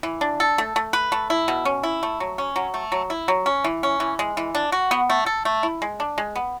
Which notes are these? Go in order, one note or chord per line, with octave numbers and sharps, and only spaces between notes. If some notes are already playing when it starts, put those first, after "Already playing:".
E3
D4
A4
A3
A3
B4
A3
E4
B2
C#4
E4
A3
F#3
C#4
F#3
A3
F#3
E4
F#3
C#4
E3
C#4
E3
G#3
E3
D4
F#4
B3
A3
A4
A3
E4
G#3
D4
G#3
B3